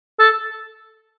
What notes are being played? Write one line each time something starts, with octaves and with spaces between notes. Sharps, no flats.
A4